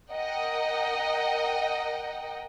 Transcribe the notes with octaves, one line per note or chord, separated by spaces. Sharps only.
A#4 D#5 F#5 G5